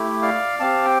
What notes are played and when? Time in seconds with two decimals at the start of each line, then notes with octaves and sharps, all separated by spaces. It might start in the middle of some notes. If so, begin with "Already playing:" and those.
Already playing: A3 E4 G4
0.22 D5 F5
0.60 C4 G4 F5 A5
0.85 G5